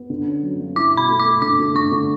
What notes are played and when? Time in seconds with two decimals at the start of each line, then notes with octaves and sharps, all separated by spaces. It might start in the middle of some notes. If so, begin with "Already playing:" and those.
Already playing: B3
0.10 D3
0.27 C#4
0.43 F#3
0.60 G2
0.75 E4 D6
0.92 B2
0.97 B5
1.09 A3
1.20 D6
1.25 A4
1.42 D3 D6
1.59 A3
1.75 D3 C#6
1.92 D3